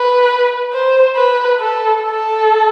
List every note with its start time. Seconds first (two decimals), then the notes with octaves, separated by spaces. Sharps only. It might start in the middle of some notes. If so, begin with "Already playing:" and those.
Already playing: B4
0.73 C5
1.16 B4
1.60 A4
2.03 A4